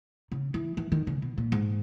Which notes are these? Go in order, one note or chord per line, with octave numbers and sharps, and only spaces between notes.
C#3
E3
E3
D#3
C#3
B2
A#2
G#2